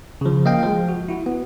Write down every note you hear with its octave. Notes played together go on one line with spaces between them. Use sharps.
C#3 F3
A#3 D#5 F5 G5
F3 G#3
F#4
E4 F#4
B3